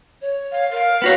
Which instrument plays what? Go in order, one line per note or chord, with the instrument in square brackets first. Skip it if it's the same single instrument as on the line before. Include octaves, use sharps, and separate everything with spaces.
[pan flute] C#5
[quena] F5
[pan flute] A#4 [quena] F5
[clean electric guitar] B3 F#4 C#5